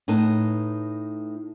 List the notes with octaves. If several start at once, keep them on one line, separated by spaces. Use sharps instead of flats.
A2 D#4 B4 A5